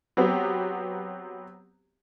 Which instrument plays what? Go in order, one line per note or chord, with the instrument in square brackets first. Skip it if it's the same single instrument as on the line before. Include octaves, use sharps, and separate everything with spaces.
[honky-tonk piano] F#3 B3 C4 G4